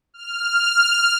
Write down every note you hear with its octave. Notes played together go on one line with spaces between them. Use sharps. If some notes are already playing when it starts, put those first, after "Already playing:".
F6